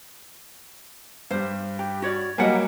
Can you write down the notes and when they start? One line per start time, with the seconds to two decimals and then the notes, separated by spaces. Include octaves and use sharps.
1.31 G2 G3 C5
1.79 G4
2.02 F#4 C#5 D5
2.38 F#3 G3 A#3 D#5 F#5 G#5